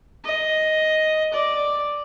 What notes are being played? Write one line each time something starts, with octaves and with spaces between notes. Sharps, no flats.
D#5
D5